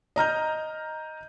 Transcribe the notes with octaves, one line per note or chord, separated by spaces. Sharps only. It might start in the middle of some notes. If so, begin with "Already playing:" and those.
D#5 A#5 F6 G6